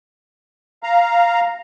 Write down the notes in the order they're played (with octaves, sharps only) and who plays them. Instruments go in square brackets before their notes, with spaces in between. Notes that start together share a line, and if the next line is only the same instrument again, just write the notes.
[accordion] F5 A#5